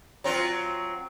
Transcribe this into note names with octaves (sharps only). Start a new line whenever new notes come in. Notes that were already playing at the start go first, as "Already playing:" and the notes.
F#3 C4 F4